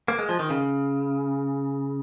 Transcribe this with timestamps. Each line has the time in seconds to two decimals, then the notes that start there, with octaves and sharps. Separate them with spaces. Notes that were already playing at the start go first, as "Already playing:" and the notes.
0.08 A#3
0.19 G#3
0.29 F3
0.39 D#3
0.50 C#3